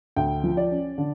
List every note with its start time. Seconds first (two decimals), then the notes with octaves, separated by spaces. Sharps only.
0.16 D2 G5
0.44 F3
0.57 D5
0.71 C#4
0.98 D3